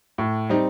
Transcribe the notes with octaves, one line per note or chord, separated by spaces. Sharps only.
A2
G3 C4 D#4